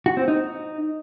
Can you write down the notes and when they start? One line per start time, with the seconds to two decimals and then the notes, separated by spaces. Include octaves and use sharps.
0.06 F#4
0.17 C4
0.28 D#4